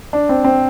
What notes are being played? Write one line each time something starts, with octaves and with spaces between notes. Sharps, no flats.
D4
C4
C4